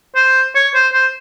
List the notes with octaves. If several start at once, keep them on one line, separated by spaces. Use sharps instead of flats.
C5
C#5
C5
C5